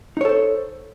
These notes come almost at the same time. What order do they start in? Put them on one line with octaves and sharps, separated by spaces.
D#4 C#5 A4 C5